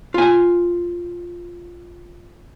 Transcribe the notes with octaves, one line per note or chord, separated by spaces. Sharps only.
F4 G#5